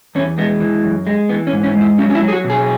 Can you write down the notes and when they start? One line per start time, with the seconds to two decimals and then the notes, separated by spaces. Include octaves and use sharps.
0.15 E2 C#4
0.38 G#3 B3
0.60 E3
0.84 F#2
1.07 G#3
1.29 E3 B3
1.47 C#4
1.53 G#2
1.63 C#4
1.75 G#3
1.81 E4
1.98 F#3 C#4
2.10 C#4
2.15 E4
2.21 F#3
2.28 G#4
2.33 F#4
2.44 B2
2.50 G#4